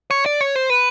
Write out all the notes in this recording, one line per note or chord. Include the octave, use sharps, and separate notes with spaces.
C#5
D5
C#5
C5
B4